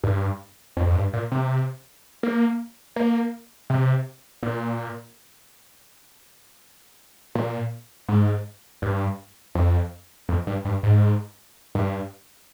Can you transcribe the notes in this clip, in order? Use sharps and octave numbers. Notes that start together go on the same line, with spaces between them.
G2
F2
F2
G2
A#2
C3
A#3
A#3
C3
A#2
A#2
G#2
G2
F2
F2
G2
G2
G#2
G2